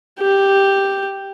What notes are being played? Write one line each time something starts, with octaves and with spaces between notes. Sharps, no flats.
G4